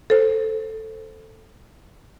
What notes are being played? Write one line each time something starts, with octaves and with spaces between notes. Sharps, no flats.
A4 C5